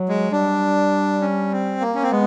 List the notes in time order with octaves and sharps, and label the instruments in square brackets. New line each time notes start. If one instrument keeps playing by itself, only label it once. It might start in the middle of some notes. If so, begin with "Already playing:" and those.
Already playing: [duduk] F#3
[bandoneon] G#3
[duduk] G3 [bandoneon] D4
[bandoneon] C#4
C4
A#3
C#4
C4
[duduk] G#3 [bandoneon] B3